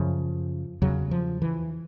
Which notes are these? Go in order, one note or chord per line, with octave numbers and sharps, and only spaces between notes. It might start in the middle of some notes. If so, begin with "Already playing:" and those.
Already playing: F#2 C#3 F3
E2 C#3 F#3
F3
E3